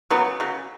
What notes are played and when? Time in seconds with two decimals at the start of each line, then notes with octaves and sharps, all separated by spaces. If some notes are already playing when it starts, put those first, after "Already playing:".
0.10 C#3 F#3 B3
0.40 C#3 F#3